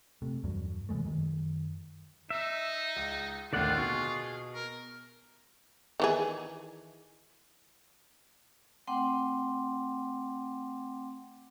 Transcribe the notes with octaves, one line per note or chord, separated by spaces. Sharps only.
C3 A3
E2 G2 F#3
C3 E3 G#3 A3
F#2 D#3
D#4 E5
C#2
D#2 A2 D3 D#3 F4 D5 F#5
B2 G#4 C#6
A#4
D#3 E3 G#4
A3 C4 F#5 G5 C6 D6